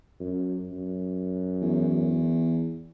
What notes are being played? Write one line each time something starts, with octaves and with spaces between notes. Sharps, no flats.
F#2
F#2
E2